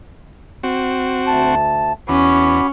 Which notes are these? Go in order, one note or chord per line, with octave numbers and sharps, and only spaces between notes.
C4 F#4
D2 A5
E2 C#4 F#4 B5 D6